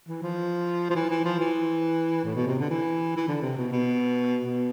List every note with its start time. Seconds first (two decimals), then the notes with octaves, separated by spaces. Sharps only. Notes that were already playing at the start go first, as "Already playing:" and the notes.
0.09 E3
0.23 F3
0.90 F3
0.96 E3
1.11 E3
1.24 F3
1.39 E3
2.24 A2
2.35 B2
2.47 C3
2.59 D3
2.70 E3
3.16 E3
3.28 D3
3.42 C3
3.57 B2
3.72 B2
4.44 B2